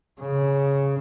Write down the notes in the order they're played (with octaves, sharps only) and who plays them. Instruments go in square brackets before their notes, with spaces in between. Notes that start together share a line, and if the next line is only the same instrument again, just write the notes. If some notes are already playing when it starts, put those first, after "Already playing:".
[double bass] C#3